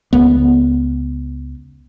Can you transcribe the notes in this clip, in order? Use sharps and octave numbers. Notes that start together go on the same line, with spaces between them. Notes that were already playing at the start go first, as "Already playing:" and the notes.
C#2 B3